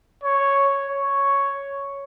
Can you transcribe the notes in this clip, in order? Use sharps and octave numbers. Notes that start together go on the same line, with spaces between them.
C#5
C#5